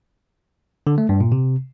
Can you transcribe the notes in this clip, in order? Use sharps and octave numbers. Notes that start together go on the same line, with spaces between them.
D3
A3
G2
A#2
C3